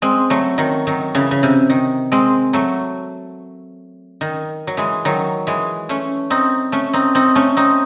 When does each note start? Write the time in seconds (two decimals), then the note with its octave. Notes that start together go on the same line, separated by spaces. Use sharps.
0.02 G#3 C4
0.30 F#3 A3
0.58 D#3 F#3
0.87 D#3 F#3
1.15 C#3 E3
1.31 C#3
1.43 C3
1.70 D#3
2.12 G#3 C4
2.53 F#3 A3
4.21 D#3
4.67 F#3
4.77 E3 G#3
5.05 D#3 F#3
5.47 E3 G#3
5.89 A3 C#4
6.30 C4 D#4
6.72 A3 C#4
6.93 C4 D#4
7.15 C4 D#4
7.35 A3 C#4
7.57 C4 D#4